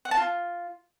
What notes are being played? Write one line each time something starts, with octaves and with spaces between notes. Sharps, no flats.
F#5
A5
F4